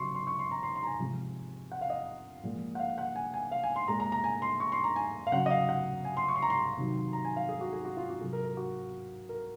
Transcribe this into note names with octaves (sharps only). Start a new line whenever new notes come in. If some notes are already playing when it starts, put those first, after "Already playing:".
Already playing: C#3 F#3 C6 C#6
C6
C#6
C6
A#5
C6
C6
A#5
G#5
C3 F3 G#3
F#5
F5
D#5
A#2 F3 G#3
F#5
F5
F#5
G#5
G#5
F5
G#5
C6
A#2 G#3 A#5
A#5
A#5
G#5
C6
C#6
C6
A#5
G#5
F5
C#3 F#3 F#5
D#5
F5
F#5
G#5
C6
C#6
C6
A#5
C6
C3 D#3 F#3
A#5
G#5
F5
G#4
F#4
G#4
F#4
F4
F#4
C3 F#3 G#4
A#4
A#4
F#4
A#4